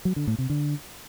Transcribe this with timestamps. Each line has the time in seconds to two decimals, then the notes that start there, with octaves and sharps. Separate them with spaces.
0.05 F#3
0.16 D3
0.27 A2
0.38 C3
0.50 D3